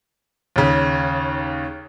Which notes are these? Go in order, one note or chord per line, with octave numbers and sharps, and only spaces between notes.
D#2 C#3